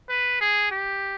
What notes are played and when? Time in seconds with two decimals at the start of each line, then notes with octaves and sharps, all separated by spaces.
0.09 B4
0.41 G#4
0.71 G4